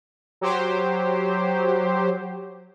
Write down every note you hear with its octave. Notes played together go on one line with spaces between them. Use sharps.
F#3 G4 C5